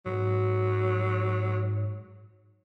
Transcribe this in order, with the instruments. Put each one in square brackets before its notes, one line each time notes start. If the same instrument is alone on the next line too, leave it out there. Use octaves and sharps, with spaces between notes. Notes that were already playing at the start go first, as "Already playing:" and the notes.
[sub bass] G#2 [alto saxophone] F#3